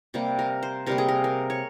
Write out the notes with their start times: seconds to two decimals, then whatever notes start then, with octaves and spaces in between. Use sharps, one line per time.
0.14 C3 G3 A#3
0.39 A#4
0.63 C5
0.86 C3 G3 A#3 A#4
0.98 G#4
1.09 A#4
1.24 A#4
1.50 C#5